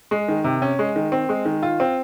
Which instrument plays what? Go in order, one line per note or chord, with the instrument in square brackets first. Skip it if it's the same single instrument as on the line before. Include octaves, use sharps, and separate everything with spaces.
[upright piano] G#3
D#3
C3
C#4
G#3
D#3
C4
G#3
D#3
F4
C4